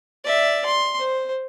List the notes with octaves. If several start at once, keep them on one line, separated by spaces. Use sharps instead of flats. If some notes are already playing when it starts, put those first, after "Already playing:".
D5 E5
C6
C5